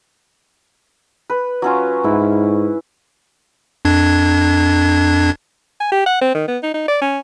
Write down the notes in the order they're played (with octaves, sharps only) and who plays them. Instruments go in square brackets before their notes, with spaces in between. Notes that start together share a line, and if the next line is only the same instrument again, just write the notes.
[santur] B4
F#3 C#4 F4
[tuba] G#2 [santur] E4
[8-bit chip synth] F2 D4 G#6
[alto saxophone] G#5
G4
F#5
C4
D#3
B3
D#4
D#4
D5
C#4